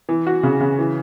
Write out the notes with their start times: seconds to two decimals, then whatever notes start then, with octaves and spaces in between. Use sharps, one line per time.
0.09 E3
0.27 F#4
0.43 C#3
0.61 C#3
0.79 E3